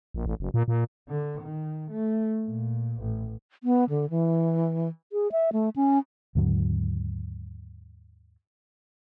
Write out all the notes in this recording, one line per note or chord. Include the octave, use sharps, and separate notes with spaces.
A#1
A1
F#1
A#2
A#2
D3
D#3
A3
A#2
A1
B3
D3
E3
G#4
E5
A3
C#4
D#2 G#2 D3 F#3